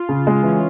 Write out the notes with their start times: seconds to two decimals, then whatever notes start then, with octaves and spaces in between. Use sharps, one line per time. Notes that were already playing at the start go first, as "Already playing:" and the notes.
Already playing: F4
0.09 C#3
0.27 G#3
0.43 E3 C#4